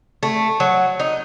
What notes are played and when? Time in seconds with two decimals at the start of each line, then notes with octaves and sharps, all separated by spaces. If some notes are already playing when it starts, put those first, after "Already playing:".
0.23 A3
0.60 F#3
1.00 D#4